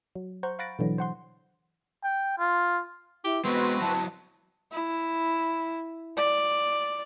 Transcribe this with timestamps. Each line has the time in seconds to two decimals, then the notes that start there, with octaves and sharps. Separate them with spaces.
0.15 F#3
0.43 C5 F#5 A#5 C#6 G6
0.59 F5 F#5 B5 A6 A#6 D7
0.79 B2 D3 E3 F#3
0.98 C5 F#5 C6
2.04 G5
2.38 F4
3.24 E4 G4
3.45 G#3 B3 C4 F#4 B4 C6
3.81 F#3 E4 A5
4.72 E4
6.17 D5